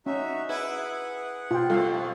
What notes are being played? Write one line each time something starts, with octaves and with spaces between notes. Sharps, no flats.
C#4 D#4 F#4 E5
E4 G#4 B4 F#5
B2 F4 F5 G5
F2 B2 G3 A4 F5